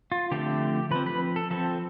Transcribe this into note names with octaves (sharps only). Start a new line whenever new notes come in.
F4
D3 F3 A3 C4 G4
F3 C4 B4
B4
A4
F3 C4 A4